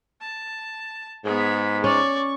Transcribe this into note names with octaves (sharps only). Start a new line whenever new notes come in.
A5
G#2 B3 G#4 B5
C#4 D5 C#6